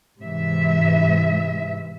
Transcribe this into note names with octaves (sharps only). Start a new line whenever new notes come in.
G#2 C3 E3 E5